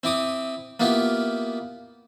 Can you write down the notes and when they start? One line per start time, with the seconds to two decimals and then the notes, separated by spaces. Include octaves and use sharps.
0.03 C4 E4 D6 D#6
0.80 A#3 B3 E4 F4 G4